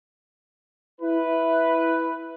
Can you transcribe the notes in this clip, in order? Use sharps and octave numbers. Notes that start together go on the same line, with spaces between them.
E4 B4